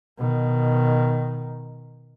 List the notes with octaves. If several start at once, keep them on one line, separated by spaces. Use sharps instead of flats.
B2 D#3